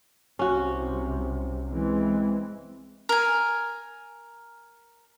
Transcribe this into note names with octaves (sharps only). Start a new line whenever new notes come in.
C2 C3 C#4 F#4
E3 G#3 C4
A#4 G#5